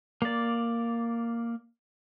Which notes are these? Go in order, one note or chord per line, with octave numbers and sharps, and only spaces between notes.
A#3 D5